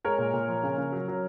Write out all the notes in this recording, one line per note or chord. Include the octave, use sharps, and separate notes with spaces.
G#3 A#4 C#5
A#2
A#2
F3
C#3
C#3
F#3
F#3